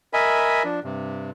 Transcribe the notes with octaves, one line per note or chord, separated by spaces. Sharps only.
A#4 D#5 E5 G#5 B5
F3 D4
G2 C3